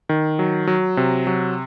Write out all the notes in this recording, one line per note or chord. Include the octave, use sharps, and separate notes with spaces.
D#3
F#3
F#3
C3
F#3